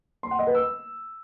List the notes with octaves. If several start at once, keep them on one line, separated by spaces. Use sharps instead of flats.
C6
F#5
D#5
B4
E6